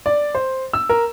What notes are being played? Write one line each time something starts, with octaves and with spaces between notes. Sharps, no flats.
D5
C5
E6
A#4